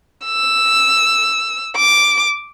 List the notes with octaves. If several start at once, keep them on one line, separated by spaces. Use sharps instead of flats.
E6
D6